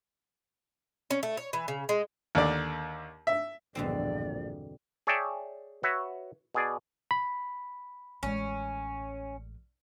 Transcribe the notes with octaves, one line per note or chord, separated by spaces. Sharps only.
C#4
A3
C#5
E3
C#3
G#3
D#2 D3 D5
E5
A#1 E2 G2 B2 D3 C4 D5
G#4 C#5 D5 E5 G5 A5
F#4 B4 C#5 E5
B2 G#4 D5
B5
A1 G#3 C#4